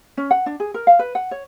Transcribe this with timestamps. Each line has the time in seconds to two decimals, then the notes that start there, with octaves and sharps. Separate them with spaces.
0.17 C#4
0.31 F#5
0.46 D4
0.60 G#4
0.74 A#4
0.87 F5
0.99 B4
1.15 F#5
1.31 C#5